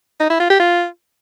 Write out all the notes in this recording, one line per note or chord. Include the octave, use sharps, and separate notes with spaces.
D#4
E4
F4
G4
F4